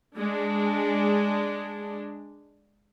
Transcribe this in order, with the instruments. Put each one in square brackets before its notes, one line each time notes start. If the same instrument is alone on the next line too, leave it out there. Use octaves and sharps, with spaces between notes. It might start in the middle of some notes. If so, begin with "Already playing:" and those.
[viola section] G#3 D4